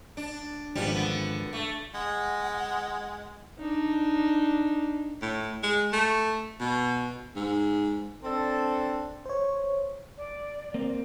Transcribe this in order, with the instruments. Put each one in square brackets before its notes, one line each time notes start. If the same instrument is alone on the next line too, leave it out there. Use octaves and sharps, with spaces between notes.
[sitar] D4
[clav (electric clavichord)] G#1 F3 D4 [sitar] G3 B3
[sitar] D3 B3
A3
[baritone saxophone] G#3 [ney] F#5
[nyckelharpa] D4 D#4
[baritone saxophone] A2
G#3
A3
B2
G#2
[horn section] C4 D4 A4
[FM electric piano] C5 C#5
[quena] D5
[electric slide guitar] A#3 C4